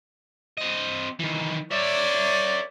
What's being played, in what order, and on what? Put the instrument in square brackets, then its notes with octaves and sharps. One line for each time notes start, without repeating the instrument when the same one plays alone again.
[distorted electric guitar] C4 D#5
D#3 E3
[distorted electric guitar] A#4 E5 [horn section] C#5 D5